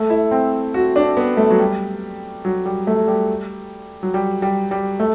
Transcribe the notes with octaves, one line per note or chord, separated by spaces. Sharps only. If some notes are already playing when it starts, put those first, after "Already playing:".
Already playing: A3
E4
C4
F#4
D4
B3
A3
F#3
G3
F#3
G3
A3
G3
F#3
G3
G3
G3
A3